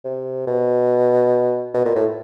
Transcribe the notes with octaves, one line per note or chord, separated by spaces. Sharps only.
C3
B2
B2
A#2
A2